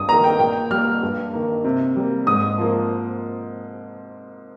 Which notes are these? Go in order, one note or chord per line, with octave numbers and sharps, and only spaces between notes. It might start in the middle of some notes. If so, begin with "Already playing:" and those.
Already playing: G2 D#6
D#3 A#3 A#5
G5
A#2 G5
G3 A#3 F6
G2
D#3 A#3
C3
G3 A#3
G#2 D#6
F3 A#3